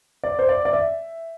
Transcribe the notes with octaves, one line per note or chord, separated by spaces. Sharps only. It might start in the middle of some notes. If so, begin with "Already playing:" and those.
D5
C5
D5
D5
E5